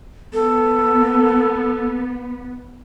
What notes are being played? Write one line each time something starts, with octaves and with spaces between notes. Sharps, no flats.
B3 A4